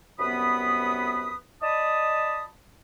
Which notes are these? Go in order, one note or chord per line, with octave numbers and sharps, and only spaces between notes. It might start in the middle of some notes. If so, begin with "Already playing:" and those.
C2 F#2 B3 B4 B5 D#6
D5 D#5 A5 B5 D#6